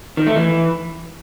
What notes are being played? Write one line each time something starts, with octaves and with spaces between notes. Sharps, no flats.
D#3
A3
E3